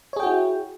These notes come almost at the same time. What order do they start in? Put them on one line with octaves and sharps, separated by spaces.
C#5 G#4 G5 F#4 E4